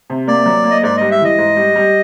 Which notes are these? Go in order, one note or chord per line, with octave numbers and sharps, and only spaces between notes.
C3
A#3 D5
F#3
A#3
D#5
G#2 D5
G3 D#5
E5
E3 D#5
G#2
G3
G3